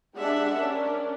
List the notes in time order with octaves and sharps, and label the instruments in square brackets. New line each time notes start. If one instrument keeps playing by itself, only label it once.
[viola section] G3 G#3 D4 G4 E5 F#5
C#4 D4 A#4